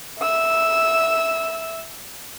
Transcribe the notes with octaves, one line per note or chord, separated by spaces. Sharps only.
E5 E6